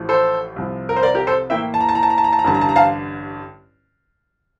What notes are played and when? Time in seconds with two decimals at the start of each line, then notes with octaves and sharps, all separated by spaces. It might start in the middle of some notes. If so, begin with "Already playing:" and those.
Already playing: A1 A2 F3 A3
0.09 A4 C5
0.56 C2 C3 F3
0.89 A#4
0.96 C5
1.03 A#4 D5
1.15 G4 A#4
1.27 A4 C5
1.50 A2 E3 A#3 E4 E5 G5
1.74 A5
1.81 A#5
1.89 A5
1.95 A#5
2.03 A5
2.10 A#5
2.18 A5
2.24 A#5
2.33 A5
2.39 A#5
2.45 A1 G2 D3 A5
2.54 A#5
2.61 A5
2.69 A#5
2.76 F5 A5